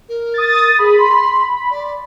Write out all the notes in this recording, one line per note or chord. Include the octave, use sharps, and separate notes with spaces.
A#4
D#6 A6
G#4 B5
C6
D5